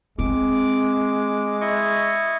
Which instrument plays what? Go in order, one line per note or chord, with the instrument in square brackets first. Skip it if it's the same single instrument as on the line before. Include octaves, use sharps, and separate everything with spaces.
[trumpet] G#3 [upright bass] C4 [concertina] D6
[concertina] E4 D#5 C#6